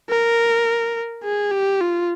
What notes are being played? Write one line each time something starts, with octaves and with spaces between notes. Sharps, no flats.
A#4
G#4
G4
F4